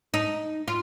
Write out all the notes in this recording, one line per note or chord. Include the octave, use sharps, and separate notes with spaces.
D#4
F4